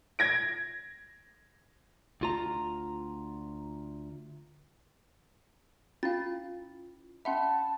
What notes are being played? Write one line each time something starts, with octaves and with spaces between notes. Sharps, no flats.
G#6 A#6 D7
D2 F4 A#5
C#4 E4 F4 F5 A6
C#4 E5 F#5 A5 B5 C6